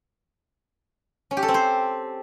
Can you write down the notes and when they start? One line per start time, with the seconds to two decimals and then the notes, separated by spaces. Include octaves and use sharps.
1.31 C#4
1.37 G4
1.43 A4
1.48 C4
1.54 C5